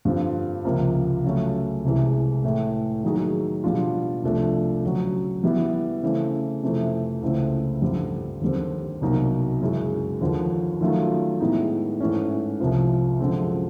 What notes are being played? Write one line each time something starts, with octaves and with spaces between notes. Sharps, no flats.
G2 D3 G3 C4 F4
C#2 C3 F3 A#3
C#3 F#3 A3 C#4
C2 C3 E3 G#3
A2 E3 A3
D#3 F#3 A#3 D#4 G#4
B2 G3 B3 D4 F4
C2 C3 F3 A3 D4
D2 C#3 F#3
E3 G3 B3 E4
C#3 E3 A3 C4
F2 C3 E3 A3 C4
C#2 C#3 E3 A3 C4
G2 D3 G3 C4
D#2 D3 G3 C4
C2 B2 F#3 A#3 D#4
F#2 C#3 E3 G#3
D#2 D3 F3
D#3 F#3 A3 C#4 F4
A2 E3 G#3 B3 D#4
G#2 E3 A3 C#4
C2 C3 F3
F#2 D3 F3 G#3 C4